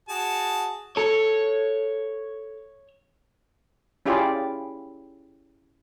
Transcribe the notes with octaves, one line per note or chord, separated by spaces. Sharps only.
F#4 G#4 A5
A4 C#5
C#4 E4 F4 G4 G#4 D5